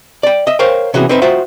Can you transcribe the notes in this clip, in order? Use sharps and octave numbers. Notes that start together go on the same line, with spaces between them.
D5 G5
D#5 E5
A#4 C5 C#5 F5 G5
C3 E3 B3 C#4 F#4 G#4
C4 D#4 B4 E5
F4 F#4 C5 E5 G5